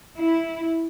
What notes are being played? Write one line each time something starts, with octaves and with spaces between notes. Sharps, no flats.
E4